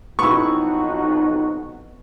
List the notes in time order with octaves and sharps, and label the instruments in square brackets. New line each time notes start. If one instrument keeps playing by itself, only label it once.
[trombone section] B1 F2 D#4 [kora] B3 E4 [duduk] F#4 [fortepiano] C#6